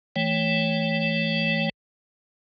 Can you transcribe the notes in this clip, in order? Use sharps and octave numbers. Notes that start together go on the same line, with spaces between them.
E3 A3 C#5 G5